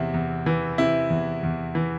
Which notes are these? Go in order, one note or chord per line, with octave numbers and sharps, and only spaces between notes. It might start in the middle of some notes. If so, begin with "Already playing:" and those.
Already playing: E2 C3 E4
E2
E3
C3 E4
E2
E2
E3